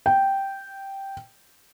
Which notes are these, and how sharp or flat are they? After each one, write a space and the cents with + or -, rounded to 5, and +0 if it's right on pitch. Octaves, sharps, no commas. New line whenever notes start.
G5 -5